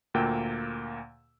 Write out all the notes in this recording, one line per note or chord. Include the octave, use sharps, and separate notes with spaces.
D2 A#2 A#3 G5 E6